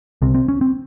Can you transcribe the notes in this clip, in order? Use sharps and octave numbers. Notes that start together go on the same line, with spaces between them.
C2 C3 C4
C4
C#4
C4